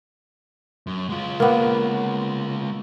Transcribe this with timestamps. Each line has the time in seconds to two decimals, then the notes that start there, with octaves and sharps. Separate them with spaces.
0.87 F#2
1.09 G#3 F4
1.40 A#3 B3